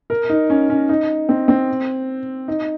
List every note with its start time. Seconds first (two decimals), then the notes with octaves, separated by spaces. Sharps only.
0.10 A#4
0.30 D#4
0.50 C#4
0.70 C#4
0.89 D#4
1.29 C4
1.48 C4
2.48 D#4